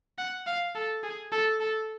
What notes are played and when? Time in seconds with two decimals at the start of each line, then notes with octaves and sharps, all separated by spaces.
0.18 F#5
0.47 F5
0.75 A4
1.03 G#4
1.32 A4
1.60 A4